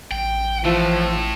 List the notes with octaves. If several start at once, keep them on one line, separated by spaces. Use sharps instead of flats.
A1 G5
A2 E3 F3